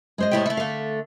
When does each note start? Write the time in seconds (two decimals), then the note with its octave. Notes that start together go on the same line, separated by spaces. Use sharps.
0.18 G#3 C5 D#5
0.31 A2 E4 G4
0.46 A3 E4
0.57 D3 A3 F5